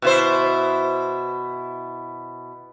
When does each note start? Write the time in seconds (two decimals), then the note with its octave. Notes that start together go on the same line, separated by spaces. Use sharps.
0.02 B2 E4 C5